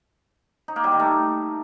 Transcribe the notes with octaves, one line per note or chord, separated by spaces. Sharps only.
D#4
A#3
G3
D#3
A3